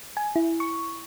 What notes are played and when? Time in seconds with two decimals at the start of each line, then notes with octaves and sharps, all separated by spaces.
0.17 G#5
0.36 E4
0.60 C#6